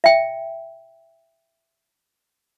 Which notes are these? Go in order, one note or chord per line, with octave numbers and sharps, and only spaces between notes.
E5 G5